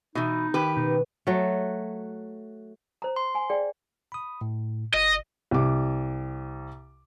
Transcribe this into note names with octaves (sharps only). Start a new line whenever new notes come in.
B2 E3 D#4
D#3 G4 B4
B2 D#4
F#3 A3
C5 A#5
C6
G#5
G#4 D5 G5
B5 D#6
A2
G1 D#5
C2 D6